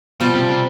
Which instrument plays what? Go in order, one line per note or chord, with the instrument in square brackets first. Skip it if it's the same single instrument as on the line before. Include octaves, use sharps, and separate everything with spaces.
[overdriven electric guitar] B2 [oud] F3 G3
[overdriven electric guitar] C3
C3